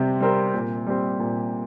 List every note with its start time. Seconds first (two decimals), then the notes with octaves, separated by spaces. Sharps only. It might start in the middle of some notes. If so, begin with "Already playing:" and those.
Already playing: C3 G3 C4
0.20 G3 C4 A#4
0.54 A#2
0.87 G3 C4
1.20 A#2